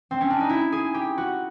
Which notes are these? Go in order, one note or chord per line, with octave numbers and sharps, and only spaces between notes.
C4
C#4
D4
D#4
E4
G#4
G4
F#4